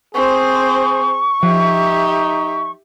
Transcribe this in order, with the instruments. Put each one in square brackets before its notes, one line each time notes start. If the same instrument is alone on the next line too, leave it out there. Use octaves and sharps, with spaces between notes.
[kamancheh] C4 C5 [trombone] G#4 [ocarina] C#6
[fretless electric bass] F3 [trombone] D#4 [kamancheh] G4 E5